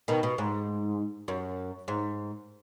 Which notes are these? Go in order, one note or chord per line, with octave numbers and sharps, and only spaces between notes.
B2 D#3
B2
G#2
F#2
G#2